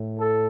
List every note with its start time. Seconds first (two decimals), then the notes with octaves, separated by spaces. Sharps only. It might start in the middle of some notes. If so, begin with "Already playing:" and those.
Already playing: A2
0.18 A4